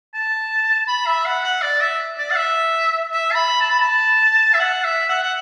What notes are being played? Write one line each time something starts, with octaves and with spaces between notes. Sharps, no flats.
A5
B5
E5
F#5
F#5
D5
E5
D5
F#5
E5
E5
A5
B5
A5
B5
A5
E5
F#5
E5
F#5
F#5